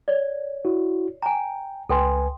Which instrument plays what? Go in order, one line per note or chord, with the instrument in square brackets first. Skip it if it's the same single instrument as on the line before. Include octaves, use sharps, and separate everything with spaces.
[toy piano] C#5 D5
[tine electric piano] E4 F#4
[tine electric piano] G5 [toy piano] G#5 A#5
[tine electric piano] C#2 B4 G#5 [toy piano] A4 G5 C6